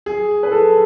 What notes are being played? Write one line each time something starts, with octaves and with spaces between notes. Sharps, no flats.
G#4
B4
A4